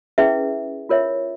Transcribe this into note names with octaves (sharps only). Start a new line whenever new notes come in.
C#4 E4 G#4 B4 E5
F4 A#4 C#5 E5